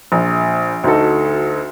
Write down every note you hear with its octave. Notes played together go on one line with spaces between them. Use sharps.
A#1
D2 D#4 F#4 A4